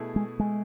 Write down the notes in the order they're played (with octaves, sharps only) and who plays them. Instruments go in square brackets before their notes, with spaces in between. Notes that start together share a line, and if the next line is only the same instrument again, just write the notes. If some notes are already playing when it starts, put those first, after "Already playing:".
Already playing: [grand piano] B2 A3 E4 G#4
[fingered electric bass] G#3
G#3